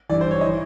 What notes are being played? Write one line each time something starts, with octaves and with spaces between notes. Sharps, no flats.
G2 E3 D5
C5
C#5
D#5
E3